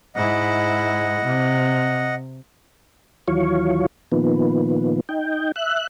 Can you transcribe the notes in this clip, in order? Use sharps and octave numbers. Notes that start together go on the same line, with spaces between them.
G#2 E4 D#5 F#5
C3
D#2 E3 F#3 F4 C#5
A#2 D#3 F3 B3
D#4 G5
E5 F#6